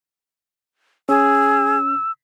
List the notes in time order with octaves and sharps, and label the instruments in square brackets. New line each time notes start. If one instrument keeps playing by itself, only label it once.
[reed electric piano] C#4 [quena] G#4 [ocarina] E6